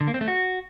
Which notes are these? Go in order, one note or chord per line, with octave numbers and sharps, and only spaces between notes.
D3
A#3
C4
A3
F#4